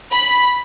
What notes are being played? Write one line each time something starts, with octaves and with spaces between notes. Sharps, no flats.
B5